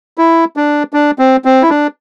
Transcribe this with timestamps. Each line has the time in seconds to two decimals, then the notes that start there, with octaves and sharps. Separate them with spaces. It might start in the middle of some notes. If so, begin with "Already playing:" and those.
0.18 E4
0.57 D4
0.93 D4
1.19 C4
1.45 C4
1.62 E4
1.70 D4